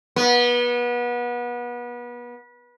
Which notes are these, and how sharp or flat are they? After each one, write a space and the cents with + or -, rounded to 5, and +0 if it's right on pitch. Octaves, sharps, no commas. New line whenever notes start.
B3 -30